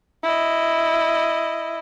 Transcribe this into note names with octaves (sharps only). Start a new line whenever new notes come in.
E4 D#5